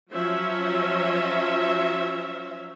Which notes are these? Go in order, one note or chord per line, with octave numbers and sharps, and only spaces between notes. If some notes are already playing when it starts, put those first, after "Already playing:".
F3 F#3 C#4 E5